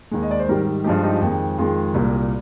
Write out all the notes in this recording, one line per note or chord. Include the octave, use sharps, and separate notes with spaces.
D#2 D#3 G#3
D#5
D5
C5
G#2 D#3 G3 G4 A#4
G2 F3 G#3 D#4 G4
D#4 G4
F2 D#3 G#3
F2 D#3 G#3 F4 G#4
C2 A#2 G3